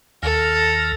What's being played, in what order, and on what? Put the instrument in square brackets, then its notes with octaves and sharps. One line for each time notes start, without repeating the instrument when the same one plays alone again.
[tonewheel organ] D#2 F6 A#6 [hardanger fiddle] A4